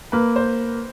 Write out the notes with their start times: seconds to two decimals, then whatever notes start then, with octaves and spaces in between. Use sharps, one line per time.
0.12 A#3 B4
0.36 C5